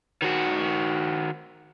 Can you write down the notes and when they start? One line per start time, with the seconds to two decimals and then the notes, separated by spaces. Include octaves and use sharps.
0.22 D#3 F#4